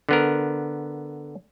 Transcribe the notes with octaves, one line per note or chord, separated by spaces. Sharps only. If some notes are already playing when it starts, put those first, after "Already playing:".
D3 B3 A#4